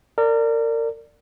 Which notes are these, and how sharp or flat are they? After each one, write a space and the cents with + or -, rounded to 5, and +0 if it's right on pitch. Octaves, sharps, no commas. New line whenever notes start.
A#4 -30 D5 +0